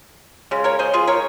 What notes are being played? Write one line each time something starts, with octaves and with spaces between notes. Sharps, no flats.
C#3 G#3
A#4 C#5
G#4 C5
F4 G#4
A#4 C#5